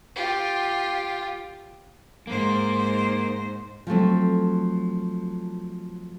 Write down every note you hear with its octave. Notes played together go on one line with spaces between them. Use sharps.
F4 G4
G#2 A#3 C5
F3 F#3 A3 C4